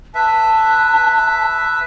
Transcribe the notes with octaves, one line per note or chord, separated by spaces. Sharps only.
B4 E5 A5